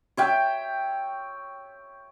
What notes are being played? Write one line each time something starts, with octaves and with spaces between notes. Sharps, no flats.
C#5 E5 G5